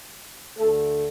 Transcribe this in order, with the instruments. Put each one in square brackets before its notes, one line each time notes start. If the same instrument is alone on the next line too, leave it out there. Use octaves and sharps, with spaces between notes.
[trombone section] D2 D3 A3 A4